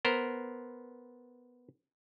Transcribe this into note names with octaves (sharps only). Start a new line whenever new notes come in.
B3 A#4 C5